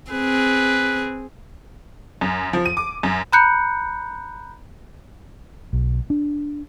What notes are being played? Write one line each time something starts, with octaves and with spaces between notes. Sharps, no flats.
C4 G#4 B4
F#2
F3
D#7
D6
F#2
A#5 B5 F#6 G6 C#7
B1
D4